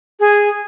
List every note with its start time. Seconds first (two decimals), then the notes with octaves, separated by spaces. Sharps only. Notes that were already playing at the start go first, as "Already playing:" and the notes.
0.20 G#4